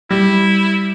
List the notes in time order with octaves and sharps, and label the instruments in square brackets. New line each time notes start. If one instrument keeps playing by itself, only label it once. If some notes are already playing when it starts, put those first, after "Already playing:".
[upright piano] G3 [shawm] E4